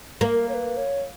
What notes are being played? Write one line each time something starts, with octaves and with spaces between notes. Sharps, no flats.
A#3 A#4 B4
C#5
B4
C#5